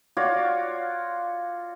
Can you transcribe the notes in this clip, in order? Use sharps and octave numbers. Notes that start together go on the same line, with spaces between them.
F4 F#4 C#5 D5